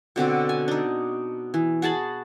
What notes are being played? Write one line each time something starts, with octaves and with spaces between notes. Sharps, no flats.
B2 D3 C4 F#4
G#5
D4 D#4
E3
F#4 G#4 A5 B5